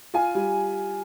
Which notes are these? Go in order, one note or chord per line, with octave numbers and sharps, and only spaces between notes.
F4 G#5
G3